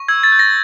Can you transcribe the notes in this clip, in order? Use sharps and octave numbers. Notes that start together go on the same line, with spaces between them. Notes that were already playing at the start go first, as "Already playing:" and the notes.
Already playing: C#6
E6 G#6
A6
G6
A#6